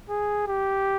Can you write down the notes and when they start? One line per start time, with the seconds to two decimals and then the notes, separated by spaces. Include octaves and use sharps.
0.09 G#4
0.47 G4